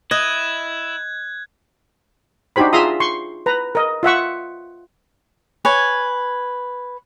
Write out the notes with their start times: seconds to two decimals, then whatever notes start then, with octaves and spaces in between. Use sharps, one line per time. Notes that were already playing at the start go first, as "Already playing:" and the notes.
0.11 E4 D#5 F#6 G#6
2.56 D4 D#4 F#4 G4 C5 B5
2.73 F4 G#4 E5 A#5 C6 D#6
3.00 C6 C#6
3.46 B4 A#5
3.75 A#4 D#5
4.03 F4 E5 F#5 C#6
5.65 B4 C#5 G#5